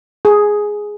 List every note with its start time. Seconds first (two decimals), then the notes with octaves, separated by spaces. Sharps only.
0.25 G#4